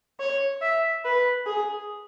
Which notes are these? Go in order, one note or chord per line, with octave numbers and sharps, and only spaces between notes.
C#5
E5
B4
G#4